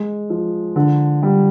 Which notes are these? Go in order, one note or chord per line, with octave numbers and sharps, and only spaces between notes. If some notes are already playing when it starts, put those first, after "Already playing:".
Already playing: G#3
F3
D3
G3